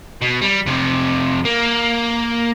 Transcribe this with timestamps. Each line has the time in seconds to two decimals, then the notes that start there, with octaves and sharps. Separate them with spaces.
0.22 B2
0.41 G3
0.66 F2 C3
1.45 A#3